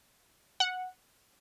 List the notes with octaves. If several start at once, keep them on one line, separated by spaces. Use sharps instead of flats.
F#5